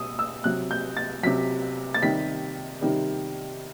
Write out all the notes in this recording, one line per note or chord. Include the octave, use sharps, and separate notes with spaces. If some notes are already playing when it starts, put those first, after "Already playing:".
Already playing: B2 G3 D#6 E6
E6
C3 F#3 F#6
G6
A6
C3 F#3 B6
A6
C3 D#3 G3 B6
C3 D#3 G3